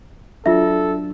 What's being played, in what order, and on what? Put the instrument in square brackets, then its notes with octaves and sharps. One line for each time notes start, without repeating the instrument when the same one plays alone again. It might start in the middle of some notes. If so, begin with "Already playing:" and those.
[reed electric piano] F#3 D4 [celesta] F4 E5 [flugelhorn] A4